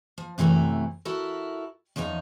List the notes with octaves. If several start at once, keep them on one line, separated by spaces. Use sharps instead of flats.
F3
F#2 C3 E3 A3 A#5
E4 F#4 A4 A#4
E2 F3 C#4 D#4 A#5